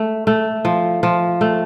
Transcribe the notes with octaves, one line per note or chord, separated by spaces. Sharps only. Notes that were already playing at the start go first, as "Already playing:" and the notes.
Already playing: A3
A3
F3
F3
A3